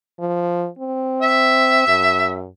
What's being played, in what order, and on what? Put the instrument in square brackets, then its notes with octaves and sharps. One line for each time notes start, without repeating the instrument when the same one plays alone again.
[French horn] F3
C4
[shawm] E5
[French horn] F#2